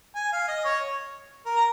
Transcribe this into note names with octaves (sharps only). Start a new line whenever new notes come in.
G#5
F5
D#5
C#5
A#4
A#5